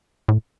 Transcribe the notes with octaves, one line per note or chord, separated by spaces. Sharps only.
A2